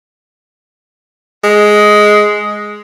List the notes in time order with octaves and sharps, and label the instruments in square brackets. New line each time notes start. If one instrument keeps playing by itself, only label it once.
[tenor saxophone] G#3